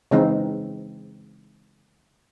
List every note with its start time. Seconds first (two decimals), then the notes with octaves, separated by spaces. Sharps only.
0.11 C#3 E3 G#3 C4 D#4